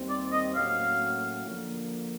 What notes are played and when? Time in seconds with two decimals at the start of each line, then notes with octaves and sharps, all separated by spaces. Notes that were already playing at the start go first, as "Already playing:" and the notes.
Already playing: D#2 D#3 G3 C4
0.09 D5
0.32 D#5
0.55 A2 F#3 A#3 C#4 F#4 F5
1.46 D3 F3 A#3